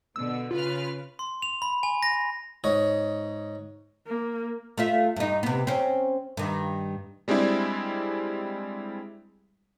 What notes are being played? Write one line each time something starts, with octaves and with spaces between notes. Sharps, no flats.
B2 D3 E6
C#3 F4 B4 F6
C6
F7
B5
G#5
A#6
G#2 C#5 D#5
A#3
A3 F4 E5
G2 D#4
C3 B3
C4 C#4
G2 D#3
G3 G#3 C4 D4 E4